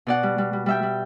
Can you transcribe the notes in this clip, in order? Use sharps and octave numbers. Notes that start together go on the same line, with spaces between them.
B2 D5 F#5
G3
G3
G3
G3 E5 G5
G3